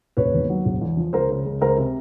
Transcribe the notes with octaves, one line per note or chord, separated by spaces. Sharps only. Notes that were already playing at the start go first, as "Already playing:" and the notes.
E1 B4 C#5
D#2
F#3
E1
E2
F3
C#2 A#4 C5
C#3
C#2
C#2 A#4 C5
C3